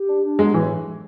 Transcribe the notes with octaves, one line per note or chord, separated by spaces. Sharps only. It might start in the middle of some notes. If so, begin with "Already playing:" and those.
Already playing: G4
D4
D4
F#3 G#3
A2 E3